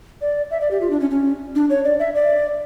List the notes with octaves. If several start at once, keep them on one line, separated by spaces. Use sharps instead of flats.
D5
E5
D5
G4
F4
D4
C#4
C#4
D4
C#5
D5
E5
D5